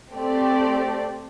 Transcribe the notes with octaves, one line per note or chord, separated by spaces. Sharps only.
A3 C4 G4 D5